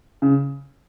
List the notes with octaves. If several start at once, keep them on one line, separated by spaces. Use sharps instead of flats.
C#3